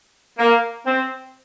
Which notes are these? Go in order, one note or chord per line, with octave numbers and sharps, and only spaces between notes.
A#3
C4